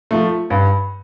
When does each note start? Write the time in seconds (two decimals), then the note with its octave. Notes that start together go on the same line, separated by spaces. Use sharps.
0.11 F3 A3
0.50 G2